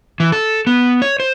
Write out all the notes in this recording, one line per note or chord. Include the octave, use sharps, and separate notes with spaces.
E3
A4
B3
C#5
C5